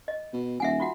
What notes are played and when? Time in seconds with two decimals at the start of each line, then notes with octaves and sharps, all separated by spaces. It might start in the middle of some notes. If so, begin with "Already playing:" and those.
0.08 D#5
0.33 B2
0.60 D#1 E5 F#5 G#5
0.80 F4 F#4 F#5